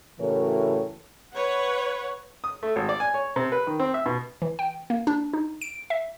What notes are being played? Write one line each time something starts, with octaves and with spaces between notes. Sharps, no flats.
A2 C#3 E3 F#4 A#4 C#5
B4 C#5 F#5
D#6
A3
G#1
D5
G#5
C#5
C3
B4
D#3
C4
E5
B2
E3
G5
A#3
D4
D#4
D7
E5